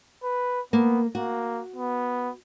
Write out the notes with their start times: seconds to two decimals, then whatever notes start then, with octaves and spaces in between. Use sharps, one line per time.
0.24 B4
0.73 A#3 B3
1.15 A#3 F#4
1.76 B3